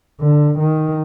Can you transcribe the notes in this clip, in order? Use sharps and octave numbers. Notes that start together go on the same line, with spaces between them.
D3
D#3